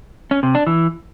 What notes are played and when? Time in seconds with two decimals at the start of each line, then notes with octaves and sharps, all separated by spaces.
0.31 C#4
0.43 C3
0.55 D4
0.67 E3